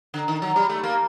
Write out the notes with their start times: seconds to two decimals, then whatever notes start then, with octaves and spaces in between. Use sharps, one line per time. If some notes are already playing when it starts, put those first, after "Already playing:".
0.14 D3
0.28 D#3
0.42 F#3
0.56 G3
0.69 A3
0.84 A#3